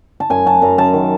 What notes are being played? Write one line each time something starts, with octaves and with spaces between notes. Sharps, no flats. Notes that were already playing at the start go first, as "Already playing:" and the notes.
A5
F#2 G#5
F#3 A5
F#2 A#5
F#2 A5
D#3